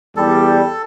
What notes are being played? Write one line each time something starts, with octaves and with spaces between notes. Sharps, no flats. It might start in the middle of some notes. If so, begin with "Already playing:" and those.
E2 G3 A4